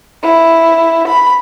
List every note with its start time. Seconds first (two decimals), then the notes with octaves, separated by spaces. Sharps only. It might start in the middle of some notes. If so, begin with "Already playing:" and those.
0.23 E4
1.08 B5